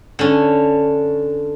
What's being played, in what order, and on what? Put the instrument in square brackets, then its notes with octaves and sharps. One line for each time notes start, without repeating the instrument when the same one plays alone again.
[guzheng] D3 C#4